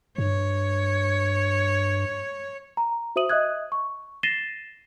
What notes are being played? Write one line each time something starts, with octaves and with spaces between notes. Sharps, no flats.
G2 C#5
A#5
F#4 C5 E5 D#6 D#7 F#7
D#5 E5 D#6 F#6 G#6
C#6
A6 A#6 C7 D#7 E7 G7